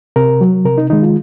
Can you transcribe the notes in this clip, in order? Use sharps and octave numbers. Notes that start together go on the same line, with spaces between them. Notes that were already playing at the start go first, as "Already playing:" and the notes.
C3 A#4
F#3
C3 A#4
D#4
D#3 G#3 D#4
F4